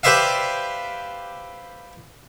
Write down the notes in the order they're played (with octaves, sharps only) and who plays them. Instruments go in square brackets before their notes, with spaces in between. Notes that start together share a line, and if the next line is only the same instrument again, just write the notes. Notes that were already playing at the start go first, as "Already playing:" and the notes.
[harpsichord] G4 B4 C5 D5 E5 F5